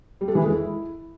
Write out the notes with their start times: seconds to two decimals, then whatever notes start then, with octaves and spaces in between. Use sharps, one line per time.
0.21 G3
0.28 A4
0.35 E3
0.42 G#3
0.49 E4